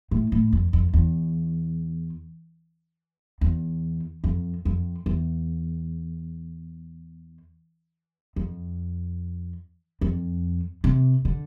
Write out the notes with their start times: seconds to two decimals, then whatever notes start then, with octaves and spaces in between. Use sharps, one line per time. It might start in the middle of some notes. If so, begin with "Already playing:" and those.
0.11 A2
0.32 A2
0.53 F2
0.73 F2
0.93 E2
3.41 E2
4.24 F2
4.65 F2
5.06 E2
8.36 F2
10.01 F2
10.84 C3
11.25 D3